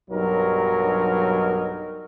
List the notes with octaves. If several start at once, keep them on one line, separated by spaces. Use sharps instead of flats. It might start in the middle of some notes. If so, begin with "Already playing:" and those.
B1 G2 F#3 D#4 A#4